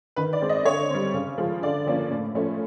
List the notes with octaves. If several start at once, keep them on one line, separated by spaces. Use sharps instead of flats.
D#3 B4
D5
G#3 C4
D#5
D3 C#5
G3 C4
C#3
F3 G#3
D3 D5
F3 A#3 C#4
A2
F3 A3 C#4